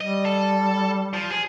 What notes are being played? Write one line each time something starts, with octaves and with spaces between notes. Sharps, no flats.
G3 D#5
A4
F3
G#4